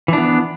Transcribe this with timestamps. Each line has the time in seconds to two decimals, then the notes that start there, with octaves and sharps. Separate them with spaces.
0.08 E3
0.13 D4
0.18 B3